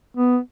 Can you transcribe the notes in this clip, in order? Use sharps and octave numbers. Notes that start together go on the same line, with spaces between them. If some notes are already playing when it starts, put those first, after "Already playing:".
B3